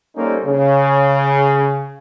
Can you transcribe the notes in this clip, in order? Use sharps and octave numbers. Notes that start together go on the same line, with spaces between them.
G3 A#3 C#4 D#4 A4 C5
C#3